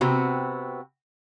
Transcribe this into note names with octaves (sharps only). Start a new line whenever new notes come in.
C3 B3 C4 F#4